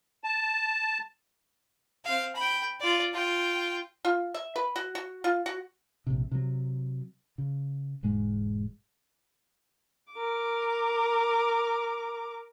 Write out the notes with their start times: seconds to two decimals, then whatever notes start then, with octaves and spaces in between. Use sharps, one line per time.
0.24 A5
2.05 C4 F5
2.36 G5 B5
2.80 F4 D5
3.14 F4 G5
4.05 F4
4.34 E5
4.56 B4
4.76 F#4
4.95 F#4
5.24 F4
5.46 F#4
6.07 A#1 C3
6.31 C3 F#3
7.38 C#3
8.03 E1 G#2 G#3
10.13 A#4 D6